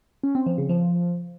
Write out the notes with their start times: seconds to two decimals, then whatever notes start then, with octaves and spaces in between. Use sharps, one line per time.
0.23 C#4
0.35 C4
0.46 F3
0.58 C#3
0.69 F3